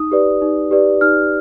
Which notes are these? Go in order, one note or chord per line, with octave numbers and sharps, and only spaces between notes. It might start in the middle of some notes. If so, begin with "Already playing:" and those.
Already playing: D#4 D#6
G4 B4 D5
D#4
G4 B4 D5
D#4 F6